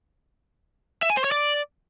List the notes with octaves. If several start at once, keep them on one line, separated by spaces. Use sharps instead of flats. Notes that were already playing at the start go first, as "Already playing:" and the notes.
E5
G#5
C5
C#5
D5